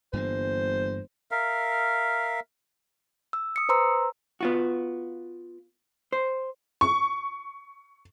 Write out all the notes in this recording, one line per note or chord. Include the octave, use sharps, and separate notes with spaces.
G1 G2 E3 A#3 C5
A#4 E5 F5
E6
D#6 C#7
B4 C5 A#5 C6 E6
B3 F4 F#4
C5
C#6